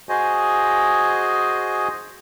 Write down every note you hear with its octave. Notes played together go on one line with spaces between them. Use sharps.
F#4 G#4 C5 D#5 G#5